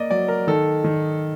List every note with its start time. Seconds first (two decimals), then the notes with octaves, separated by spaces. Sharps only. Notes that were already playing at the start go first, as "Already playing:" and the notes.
Already playing: A#3 D5 D#5
0.11 F#3 D5
0.28 A#4
0.47 D#3 A4
0.84 D#3